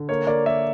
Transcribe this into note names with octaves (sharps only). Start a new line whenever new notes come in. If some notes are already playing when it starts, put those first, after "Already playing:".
Already playing: D3
A#3 C#5
A#3 D5
A#3 E5